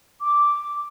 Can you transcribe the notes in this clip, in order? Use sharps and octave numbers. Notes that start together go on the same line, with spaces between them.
D6